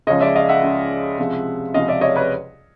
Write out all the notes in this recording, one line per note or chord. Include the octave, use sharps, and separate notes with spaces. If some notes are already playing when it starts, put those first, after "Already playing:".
C#2 C#3 F3 G#3 C#5 D#5
D5 E5
D#5 F5
E5 F#5
C#2 C#3 F3 G#3
C#2 C3 F3 G#3
C#2 C3 F3 G#3 D#5 F5
D5 E5
C#5 D#5
B4 C#5